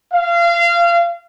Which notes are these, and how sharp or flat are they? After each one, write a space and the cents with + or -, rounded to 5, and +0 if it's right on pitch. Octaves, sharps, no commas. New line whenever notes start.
F5 -25